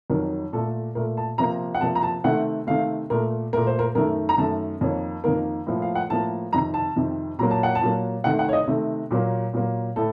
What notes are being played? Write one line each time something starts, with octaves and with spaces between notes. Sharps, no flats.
F2 D#3 F#3 A#4
A#2 A3 A4
A#2 A3 A#4
A5
C3 F3 A#3 A#5
F#5
C3 F3 A#3 A5
A#5
A5
C3 D#3 A3 F#5
C3 D#3 A3 F5
A#2 A3 A#4
A#2 A3 A#4
C5
A#4
F#2 D#3 A3 A#4
A#5
F#2 D#3 A3 A5
F2 D#3 A#3 C#5
F2 D#3 A#3 A#4
A2 F3 A#3
F5
F#5
A2 F3 A#3 A5
F2 C3 D#3 A#5
A5
F2 C3 D#3
A#2 F#3 A#3 A#5
A5
F#5
A5
A#2 F#3 A#3
C3 D#3 A3 F#5
F#5
C#5
D#5
C3 D#3 A3
A#2 F#3 A#3
A#2 F#3 A#3
A2 A4